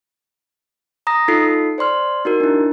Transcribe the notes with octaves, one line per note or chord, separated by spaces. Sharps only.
A#5 D#6 A#6
D#4 F4 A4 C7
C5 D5 C6 F6
D#4 F#4 A#4
D4 E4